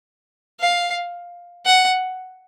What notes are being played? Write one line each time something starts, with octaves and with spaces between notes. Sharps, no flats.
F5
F#5